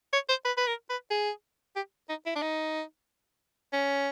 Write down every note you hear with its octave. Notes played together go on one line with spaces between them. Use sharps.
C#5
C5
B4
B4
A#4
B4
G#4
G4
D#4
E4
D4
D#4
C#4